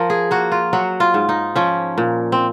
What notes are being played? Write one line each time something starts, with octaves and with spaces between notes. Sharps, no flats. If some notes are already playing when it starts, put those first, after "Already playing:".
Already playing: F3 A#4
G#4
A#3 F#4
F4
F#3 F#4
F4
G#2
D#4
F3 C#4
A#2
C4